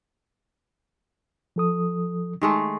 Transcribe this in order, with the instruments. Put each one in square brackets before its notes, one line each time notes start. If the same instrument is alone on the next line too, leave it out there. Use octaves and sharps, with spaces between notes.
[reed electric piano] F3 A4 D#6
[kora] D#3 G#3 A3